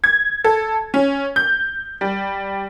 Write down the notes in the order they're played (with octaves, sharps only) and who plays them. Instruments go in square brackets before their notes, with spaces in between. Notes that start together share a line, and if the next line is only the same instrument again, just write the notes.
[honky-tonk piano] G#6
A4
C#4
G6
G3